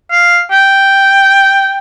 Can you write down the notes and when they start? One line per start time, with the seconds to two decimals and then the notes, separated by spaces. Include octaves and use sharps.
0.11 F5
0.51 G5